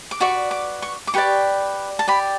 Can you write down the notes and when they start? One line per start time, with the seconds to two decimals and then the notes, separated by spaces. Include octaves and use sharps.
0.11 D6
0.20 F#4 B4 D5 C#6
0.51 D6
0.82 C#6
1.07 D6
1.14 G4 B4 D5 C#6
1.99 A5
2.08 G4 D5 B5